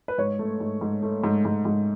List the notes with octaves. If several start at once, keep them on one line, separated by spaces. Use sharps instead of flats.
B4
G#2 C#5
A3
G#2
G#2
A3
G#2
G#2
G#2